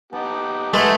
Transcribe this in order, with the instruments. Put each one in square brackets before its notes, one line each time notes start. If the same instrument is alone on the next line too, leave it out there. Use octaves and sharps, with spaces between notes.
[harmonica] B3 D#4 G4 [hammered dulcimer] A5
[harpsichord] G#3 [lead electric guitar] A3 [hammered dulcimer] B4 F#5